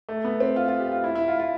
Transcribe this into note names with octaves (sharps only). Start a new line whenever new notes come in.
A3
B3
C4
F4
F4
G4
F4
E4
E4
F4
F4